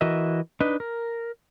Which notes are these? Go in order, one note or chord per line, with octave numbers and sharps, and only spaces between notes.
E3 F#4 A#4 D#5 E5
D4 D#4 B4 D#5
A#4